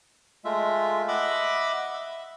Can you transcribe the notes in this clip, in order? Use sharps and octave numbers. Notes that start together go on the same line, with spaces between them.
G#3 A3 F4 E5
D#5 E5 F#5 B5 D6 E6
E5